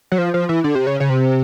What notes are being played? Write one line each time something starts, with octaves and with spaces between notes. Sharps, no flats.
F#3
F3
F3
E3
D3
C3
C#3
C#3
C3